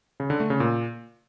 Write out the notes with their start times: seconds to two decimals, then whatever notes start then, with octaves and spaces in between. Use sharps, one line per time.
0.20 C#3
0.30 D3
0.40 A3
0.50 C#3
0.60 A#2